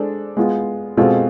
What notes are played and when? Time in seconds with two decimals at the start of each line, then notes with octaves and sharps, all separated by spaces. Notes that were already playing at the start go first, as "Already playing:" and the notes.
Already playing: G#3 D4 A4 C5
0.37 G#3 B3 F4
0.97 B2 G#3 C4 F4 A4